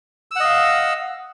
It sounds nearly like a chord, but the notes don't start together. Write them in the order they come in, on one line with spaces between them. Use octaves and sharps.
E6 F#5 D#5 F5